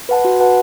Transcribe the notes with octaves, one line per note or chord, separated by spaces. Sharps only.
B4 F#5 A5
F#4
B4 F#5 A5